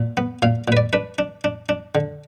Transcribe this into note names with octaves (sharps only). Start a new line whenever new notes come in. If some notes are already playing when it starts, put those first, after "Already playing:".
Already playing: A#2
B3
A#2 F5
A#2 B4
D5
D4 B4
D4
D4
D4
D3